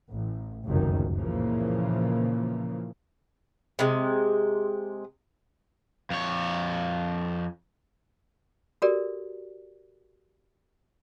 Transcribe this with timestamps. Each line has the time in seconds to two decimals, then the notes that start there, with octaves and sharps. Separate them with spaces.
0.11 A1
0.65 F1 C#2 F#2 D#3
1.16 A#2 C#3 E3 F3 A#3
3.79 C3 G#3
6.10 F2 C#5
8.82 F#4 G4 A4 A#4 D5